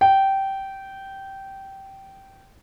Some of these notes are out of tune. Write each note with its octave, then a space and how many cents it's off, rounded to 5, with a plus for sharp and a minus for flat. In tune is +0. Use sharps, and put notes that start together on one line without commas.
G5 -15